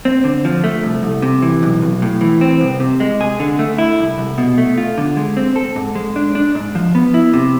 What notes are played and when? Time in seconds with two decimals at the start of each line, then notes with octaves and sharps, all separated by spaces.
0.05 C4
0.24 D3
0.45 F3
0.64 A3
0.83 C2
1.03 C2
1.22 C3
1.42 E3
1.63 B1
1.82 B1
2.02 A2
2.21 E3
2.41 C4
2.61 C2
2.80 C3
3.00 G#3
3.21 G#4
3.40 D3
3.59 A3
3.78 E4
3.99 C2
4.18 C2
4.38 B2
4.58 A3
4.78 F4
4.98 D3
5.17 G#3
5.37 C4
5.56 A4
5.76 G#2
5.95 G#3
6.16 D4
6.35 D4
6.55 G#2
6.75 F3
6.95 B3
7.14 E4
7.33 C3